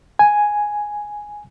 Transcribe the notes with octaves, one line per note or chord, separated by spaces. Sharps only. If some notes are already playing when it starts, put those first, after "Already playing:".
G#5